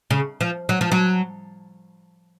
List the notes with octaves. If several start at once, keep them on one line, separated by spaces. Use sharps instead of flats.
C#3
F3
F#3
F3
F#3